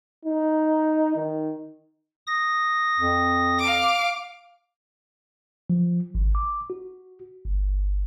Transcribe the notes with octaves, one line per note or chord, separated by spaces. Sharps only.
D#4
D#3
D#6 A#6
F2
F5 D6
F3
G#1
D6
F#4
G1